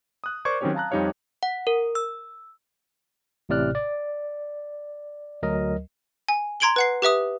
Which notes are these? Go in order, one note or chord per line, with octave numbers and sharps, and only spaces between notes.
D#6 F#6
A#4 C5 D5 C#6 D6 G#6
D#3 F#3 C4 C#4 G4 C#5
F5 A5 A#5 F#6
F2 G3 D#4 G4 C#5 F5
F#5
A#4
E6
A1 A2 C3 D5 F6 F#6
D5
D2 F#3 A#4 D#5
G#5
A#5 C6 G#6 D7 F#7 G7
B4 F#5 C7
G4 B4 E5 D#6